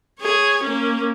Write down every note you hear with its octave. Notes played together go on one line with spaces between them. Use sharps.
G#4 C#5
A#3 C#4